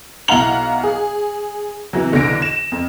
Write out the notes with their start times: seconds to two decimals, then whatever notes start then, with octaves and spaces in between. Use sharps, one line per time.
0.28 B1 E4 F5 F#5 A#5 F#7
0.84 G#4
1.93 C3 E3 F#3
2.12 B1 D3 E3 A#6 D7
2.42 E7
2.72 F2